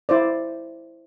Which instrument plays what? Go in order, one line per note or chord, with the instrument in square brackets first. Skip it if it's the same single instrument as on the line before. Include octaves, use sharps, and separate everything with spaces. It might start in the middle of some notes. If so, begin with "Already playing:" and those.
[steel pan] E4 C5 D5